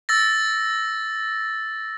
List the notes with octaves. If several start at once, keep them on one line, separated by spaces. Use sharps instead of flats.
E6 A6 A#6